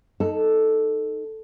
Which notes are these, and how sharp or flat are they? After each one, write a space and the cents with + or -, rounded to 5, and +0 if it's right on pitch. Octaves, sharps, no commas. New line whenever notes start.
D#4 +0 A4 +0